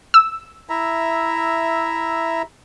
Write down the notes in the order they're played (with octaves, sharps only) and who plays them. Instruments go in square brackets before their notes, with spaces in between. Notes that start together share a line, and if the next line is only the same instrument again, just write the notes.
[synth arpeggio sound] E6
[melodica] E4 E5 A#5